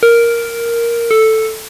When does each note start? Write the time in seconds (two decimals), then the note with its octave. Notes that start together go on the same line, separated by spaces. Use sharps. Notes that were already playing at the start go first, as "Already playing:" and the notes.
0.03 A#4
1.11 A4